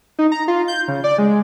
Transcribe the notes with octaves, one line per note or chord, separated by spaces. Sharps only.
D#4
A#5
F4
G6
C#3
D5
G#3